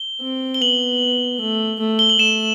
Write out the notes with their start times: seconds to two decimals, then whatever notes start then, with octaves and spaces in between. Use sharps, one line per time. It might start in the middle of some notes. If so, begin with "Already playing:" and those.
Already playing: G7
0.22 C4
0.54 G7
0.61 B3 F#7
1.40 A3
1.80 A3
1.99 G7
2.09 F#7
2.19 A3 E7